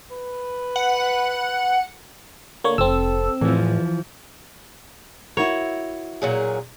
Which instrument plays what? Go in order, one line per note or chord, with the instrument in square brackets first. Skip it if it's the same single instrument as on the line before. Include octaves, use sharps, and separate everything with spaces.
[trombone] B4
[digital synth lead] F#5
[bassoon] D3 [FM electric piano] A#3 C#5
[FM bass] F1 [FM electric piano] C4 E6 [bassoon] A4
[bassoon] E2 [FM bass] A2 [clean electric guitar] E3 F3
[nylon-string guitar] E4 F#4 A#4 [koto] C#5
[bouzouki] A#2 F#3 G#4